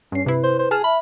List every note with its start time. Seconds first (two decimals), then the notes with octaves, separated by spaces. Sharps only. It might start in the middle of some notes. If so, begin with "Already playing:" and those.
0.12 G2 C#4 C7
0.26 C3 E4 B4
0.44 C5
0.59 C5
0.71 G#4 A5 F6
0.84 E5 B5